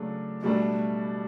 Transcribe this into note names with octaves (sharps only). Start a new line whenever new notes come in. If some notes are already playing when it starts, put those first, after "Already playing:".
Already playing: C#3 F#3 A3 D4
B2 G3 A3 D4 A4